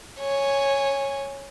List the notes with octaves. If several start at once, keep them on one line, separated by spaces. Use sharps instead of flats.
C#5 G#5